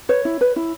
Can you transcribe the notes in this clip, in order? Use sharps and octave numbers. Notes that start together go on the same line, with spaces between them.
B4 C#5
E4
B4
E4